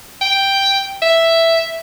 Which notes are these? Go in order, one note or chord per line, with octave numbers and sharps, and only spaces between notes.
G5
E5